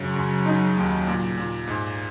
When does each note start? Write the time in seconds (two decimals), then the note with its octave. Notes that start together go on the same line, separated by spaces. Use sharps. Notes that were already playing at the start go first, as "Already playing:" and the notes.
Already playing: F#2 C#3 F#3
0.16 F#2
0.46 D#4
0.77 D#2
1.07 A#2
1.37 A#2
1.67 G#2